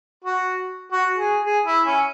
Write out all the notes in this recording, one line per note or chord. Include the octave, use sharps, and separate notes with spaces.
F#4
F#4
G#4
G#4
E4
C#4